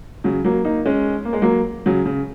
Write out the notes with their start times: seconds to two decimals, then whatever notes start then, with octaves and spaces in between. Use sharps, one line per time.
0.24 C#3 F#3
0.44 F#3 A#3
0.64 A#3 D#4
0.86 G#3 C#4
1.25 A#3
1.33 G#3
1.42 F#3 A#3
1.86 C#3 F#3
2.05 C#3